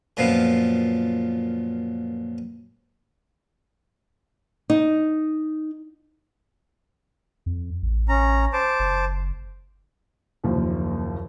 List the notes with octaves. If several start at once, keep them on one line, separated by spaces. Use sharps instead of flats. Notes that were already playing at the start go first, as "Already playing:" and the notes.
F#2 A#2 F3 B3 F5
D#4
F2
A1
C#4 A#5
C5 A5 D6
F#1
F#1 D#2 F3